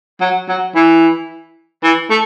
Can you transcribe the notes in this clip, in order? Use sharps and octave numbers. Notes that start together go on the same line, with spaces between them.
F#3
F#3
E3
E3
A3